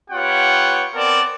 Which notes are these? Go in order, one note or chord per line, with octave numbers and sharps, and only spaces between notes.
B3 F4 G4 C#5 F#5 G5
B3 C4 A#4 D5 A5